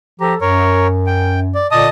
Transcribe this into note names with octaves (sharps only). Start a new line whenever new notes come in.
F3 G4 A4 A#5
F#2 A#4 C#5
G5
D5
A#2 D3 D5 D#5 A5 D#6